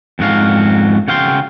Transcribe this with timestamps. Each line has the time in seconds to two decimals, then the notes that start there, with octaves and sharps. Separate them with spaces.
0.19 F2 G#2 F#4 F5
1.08 C#3 F#4 F5 G5 C6